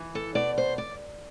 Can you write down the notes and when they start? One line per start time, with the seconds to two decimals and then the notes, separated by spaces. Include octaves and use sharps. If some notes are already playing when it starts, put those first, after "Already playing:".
Already playing: E3
0.15 A4
0.35 B2 D5
0.58 C5
0.78 D5